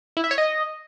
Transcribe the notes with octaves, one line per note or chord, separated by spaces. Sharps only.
E4
E5
C#5
D#5